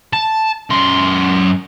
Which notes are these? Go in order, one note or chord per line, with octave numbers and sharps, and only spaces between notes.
A5
F#2 C6